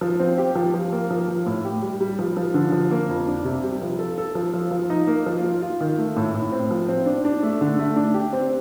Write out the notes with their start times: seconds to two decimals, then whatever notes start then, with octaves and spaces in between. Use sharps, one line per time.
0.01 F3
0.20 C4
0.38 G4
0.55 F3
0.74 F3
0.92 A#3
1.10 F3
1.28 F3
1.46 A2
1.65 G4
1.82 G3
2.01 G3
2.19 F3
2.37 F3
2.54 D3
2.72 F3
2.91 A#3
3.09 F2
3.27 D4
3.44 C3
3.64 G3
3.82 F3
3.99 A4
4.18 A4
4.35 F3
4.54 F3
4.71 F3
4.90 D#4
5.07 A#3
5.26 F3
5.44 F4
5.62 F4
5.81 D#3
5.98 A3
6.16 A2
6.34 A2
6.52 C4
6.71 F3
6.89 C4
7.06 D4
7.25 D4
7.43 A3
7.61 D3
7.79 A3
7.96 D4
8.14 G4
8.33 C4